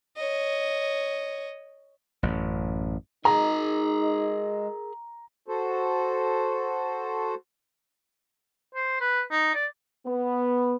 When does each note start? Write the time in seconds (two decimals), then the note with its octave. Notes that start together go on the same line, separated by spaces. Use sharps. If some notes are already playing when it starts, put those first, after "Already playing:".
0.17 C#5 D#5
2.23 A1 F#2
3.25 G#3 D#4 G#4 A#4 A#5
5.48 F#4 A4 C5
8.75 C5
9.01 B4
9.31 D#4
9.55 D5
10.06 B3